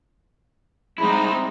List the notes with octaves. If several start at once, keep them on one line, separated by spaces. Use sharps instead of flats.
G3 G#3 C4 D#4 E4